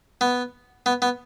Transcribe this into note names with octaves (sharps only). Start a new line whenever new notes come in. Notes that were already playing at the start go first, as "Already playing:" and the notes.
B3
B3
B3